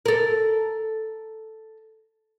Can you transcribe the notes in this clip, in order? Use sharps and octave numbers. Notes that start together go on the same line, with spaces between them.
A4 A#4